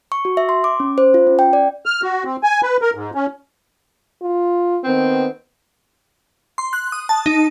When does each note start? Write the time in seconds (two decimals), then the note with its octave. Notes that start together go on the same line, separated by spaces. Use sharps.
0.12 C#6
0.25 F#4
0.37 E5
0.49 C6
0.64 D6
0.80 C#4
0.98 C5
1.14 F4
1.27 C#4
1.39 G5
1.53 D5
1.86 F6
2.03 F#4
2.25 C4
2.43 G#5
2.63 B4
2.82 A#4
2.95 G#2
3.15 C#4
4.22 F4
4.84 D#3 B3 C4
6.58 C6
6.73 F#6
6.92 D#6
7.09 A5
7.26 D#4